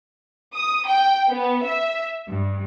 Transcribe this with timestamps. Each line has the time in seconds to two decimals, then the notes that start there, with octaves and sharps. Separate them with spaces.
0.55 D#6
0.88 G5
1.30 B3
1.64 E5
2.29 G2